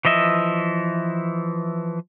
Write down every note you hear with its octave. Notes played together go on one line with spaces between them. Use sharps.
E3 F3 D#5 E5